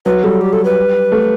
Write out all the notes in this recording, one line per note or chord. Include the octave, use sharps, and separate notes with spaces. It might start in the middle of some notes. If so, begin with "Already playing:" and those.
F#3 B4
G3 A4
G4
A4
B4
A3